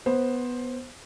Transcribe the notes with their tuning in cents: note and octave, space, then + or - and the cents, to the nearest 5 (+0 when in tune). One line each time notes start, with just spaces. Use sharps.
B3 +0 C5 +10